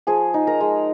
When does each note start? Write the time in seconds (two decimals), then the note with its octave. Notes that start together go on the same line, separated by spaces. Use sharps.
0.07 F3 G#4 G#5
0.34 D#4
0.47 A#4 A#5
0.61 G#3